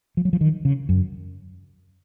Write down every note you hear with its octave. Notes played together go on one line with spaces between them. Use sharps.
F3
F#3
F3
D#3
C#3
F#2